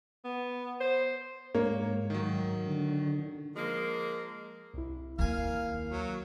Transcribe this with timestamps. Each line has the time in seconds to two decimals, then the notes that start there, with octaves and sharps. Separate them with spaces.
0.25 B3
0.80 C5
1.55 G#2 A#3 C#5
2.10 D#3 F#3
2.67 D3
3.55 F3 G#3 A#3
4.74 C2 E4
5.19 D#2 A#3 F5 G#5
5.90 F#3